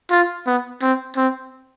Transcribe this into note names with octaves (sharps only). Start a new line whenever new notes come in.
F4
B3
C4
C4